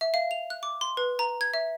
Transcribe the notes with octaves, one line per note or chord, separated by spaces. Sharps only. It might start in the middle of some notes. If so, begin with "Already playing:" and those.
E5
F5
F7
F#6
D6
C6
B4
A#5
G#6
E5